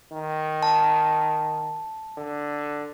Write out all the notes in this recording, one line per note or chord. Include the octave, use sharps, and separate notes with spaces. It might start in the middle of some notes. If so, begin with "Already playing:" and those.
D#3
A5
D3